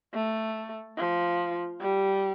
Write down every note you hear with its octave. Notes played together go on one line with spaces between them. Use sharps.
A3
F3
G3